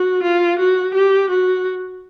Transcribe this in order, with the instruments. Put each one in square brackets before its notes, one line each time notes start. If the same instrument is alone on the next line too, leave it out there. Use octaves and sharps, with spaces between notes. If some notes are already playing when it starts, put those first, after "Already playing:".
Already playing: [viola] F#4
F4
F#4
G4
F#4